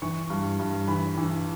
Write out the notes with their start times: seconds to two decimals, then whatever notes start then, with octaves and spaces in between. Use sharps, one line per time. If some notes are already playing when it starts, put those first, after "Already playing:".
0.02 E3 C#6
0.30 G2
0.59 G2
0.88 E3 B5
1.18 E3